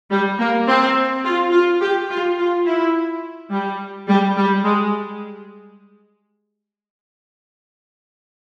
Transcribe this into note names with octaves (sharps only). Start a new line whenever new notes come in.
G3
A#3
C4
F4
F4
G4
F4
F4
E4
G3
G3
G3
G#3